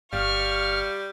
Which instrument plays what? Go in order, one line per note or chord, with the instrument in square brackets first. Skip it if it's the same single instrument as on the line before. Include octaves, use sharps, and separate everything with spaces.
[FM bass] G1 [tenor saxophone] G3 [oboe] F5 [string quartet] C#6 F6